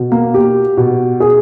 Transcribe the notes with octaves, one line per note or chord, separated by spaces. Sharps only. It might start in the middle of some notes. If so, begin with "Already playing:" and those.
Already playing: B2
A#3
G4
B2
G#4